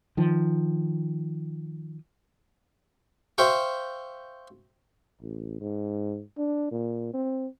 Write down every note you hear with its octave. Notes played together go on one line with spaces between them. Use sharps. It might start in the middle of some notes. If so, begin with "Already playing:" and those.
D#3 F3
C5 E5 F5 G5 C#6
A1
G#2
D4
A#2
C4